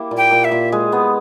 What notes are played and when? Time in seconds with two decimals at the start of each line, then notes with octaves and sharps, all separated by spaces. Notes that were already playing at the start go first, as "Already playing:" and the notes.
Already playing: A#3 E4 G4
0.11 A#2
0.17 G5
0.31 A#2
0.44 E5
0.51 A#2
0.72 G#3
0.92 B3